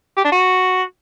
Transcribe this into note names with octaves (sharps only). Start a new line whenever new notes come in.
G4
D4
F#4